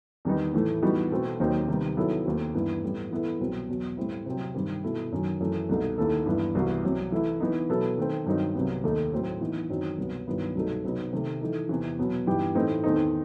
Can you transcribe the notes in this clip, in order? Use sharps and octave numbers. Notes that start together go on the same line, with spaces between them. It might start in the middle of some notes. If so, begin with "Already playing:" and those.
E2 D#3 G3 B3 D#4
A2 E3 A3
E3 G3 B3 D#4 F#4
B2 A3 C4 F#4 A4
D#2 D#3 F#3 C4 D#4
C3 D#3 G3 B3
D#3 F#3 B3 E4 A4
D#2 D#3 A3 C4 F#4
G2 E3 B3 E4
A2 G3 B3
E3 B3 E4 A4
C2 B2 F#3 C4
E2 B2 F#3
A2 G3 C4 E4
C3 F#3 C4
G2 D#3 G3 C4
B2 A3 E4
F#2 D#3 F#3
F#2 E3 A3
C2 B2 A3 D#4 A4
D#2 D#3 A3 E4 A4
G2 E3 B3 E4
C2 C3 E3 B3 F#4
C2 C3 F#3
E3 A3 E4
E3 B3 D#4
B2 F#3 B3 E4 A4
D#3 A3 C4
G2 D#3 F#3 C4 D#4
C2 C3 F#3 B3
D#2 D#3 A3 D#4 A4
A2 F#3 C4
E3 B3 D#4
F#2 D#3 F#3 C4 D#4
C2 B2 F#3 B3
G2 D#3 F#3 B3 E4
C2 B2 F#3 A3 D#4
C3 F#3 B3 D#4
C3 D#3 A3
E3 A3 D#4 A4
E2 C3 E3
B2 F#3 B3
G2 E3 B3 D#4 G4
A2 E3 A3 C4 D#4
E2 D#3 A3 C4 D#4